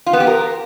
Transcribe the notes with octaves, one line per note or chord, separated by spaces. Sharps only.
F4
B3
G4
A#4